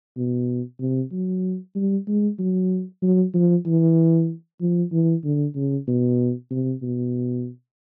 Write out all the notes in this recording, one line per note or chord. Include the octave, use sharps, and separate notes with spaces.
B2
C3
F#3
G3
G#3
F#3
F#3
F3
E3
F3
E3
D3
C#3
B2
C3
B2